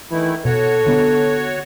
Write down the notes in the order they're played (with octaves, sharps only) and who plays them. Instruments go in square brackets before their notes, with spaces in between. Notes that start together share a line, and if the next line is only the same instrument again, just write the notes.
[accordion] D#3 A3 E4 [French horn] E3
[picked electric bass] B2 [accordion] F#4 C#5 [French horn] A4
[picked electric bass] D3 B3